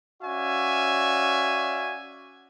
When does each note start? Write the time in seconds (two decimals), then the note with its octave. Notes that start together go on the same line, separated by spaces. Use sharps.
0.23 C#4 F#4 D5 E5 F5 G#5